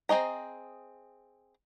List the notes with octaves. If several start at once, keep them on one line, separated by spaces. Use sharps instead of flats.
C4 C#4 G#4 D#5 A#5